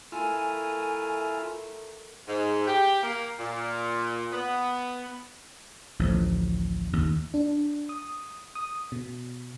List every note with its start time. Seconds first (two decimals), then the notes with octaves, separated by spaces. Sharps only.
0.12 A3 E4 F4 A#4 G#5
2.28 G#2
2.68 G4
3.03 A#3
3.39 A#2
4.32 B3
5.99 A1 D2 F3
6.93 D#2
7.34 D4
7.89 D#6
8.55 D#6
8.92 B2